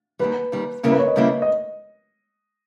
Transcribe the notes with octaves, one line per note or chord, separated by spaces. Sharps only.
D#2 D#3 G3 B4
D#2 D#3 G3
D#2 C#3 G3 A#3 E4 A#4
B4
C#5
D#5
D#2 C#3 G3 A#3 E4
D#5